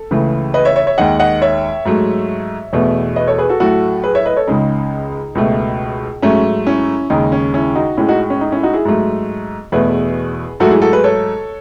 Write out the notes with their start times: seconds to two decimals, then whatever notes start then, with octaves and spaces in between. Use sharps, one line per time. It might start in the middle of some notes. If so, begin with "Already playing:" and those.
Already playing: A4
0.11 C#2 C#3 E3 A3
0.54 B4 D#5
0.65 C#5 E5
0.76 C#5 E5
0.87 C#5 E5
0.98 D#2 D#3 G#3 D#5 F#5
1.19 D#5 F#5
1.42 C#5 E5
1.85 G#2 F#3 A3
2.73 E2 B2 A3
3.16 B4 D#5
3.28 A4 C#5
3.38 G#4 B4
3.49 F#4 A4
3.60 A2 F#3 A3 F#4 A4
4.04 G#4 B4
4.15 C#5 E5
4.26 B4 D#5
4.36 A4 C#5
4.48 C#2 C#3 G#3 D#4
5.35 C#2 B2 A3
6.22 G#2 F#3 A3 C#4
6.66 C#4 E4
7.10 D#2 C#3 G#3 D#4
7.32 C#4
7.54 C#4 E4
7.75 D#4 F#4
7.97 A2 G#3 C#4 E4
8.09 D#4 F#4
8.30 C#4
8.41 D#4
8.52 C#4 E4
8.63 D#4 F#4
8.73 E4 G#4
8.85 G#2 F#3 A3
9.72 E2 B2 A3 G#4 B4
10.60 G#2 F#3 A3 F#4 A4
10.71 E4 G#4
10.82 F#4 A4
10.93 G#4 B4
11.04 A4 C#5